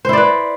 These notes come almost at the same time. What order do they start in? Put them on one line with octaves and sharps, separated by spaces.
C5 E4 D5 B4